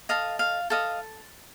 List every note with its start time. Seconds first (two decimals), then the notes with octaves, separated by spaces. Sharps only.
0.09 A4 D#5 F5
0.39 F5
0.70 A4 D#5 F5